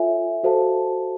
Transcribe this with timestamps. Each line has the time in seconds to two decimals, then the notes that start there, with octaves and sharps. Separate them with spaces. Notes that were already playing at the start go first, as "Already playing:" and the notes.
Already playing: F4 A4 C#5 E5 G#5
0.44 F#4 A4 C5 F5 A5